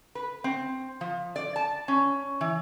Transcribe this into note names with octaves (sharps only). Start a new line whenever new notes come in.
B4
C4
F3
D5
A5
C#4
E3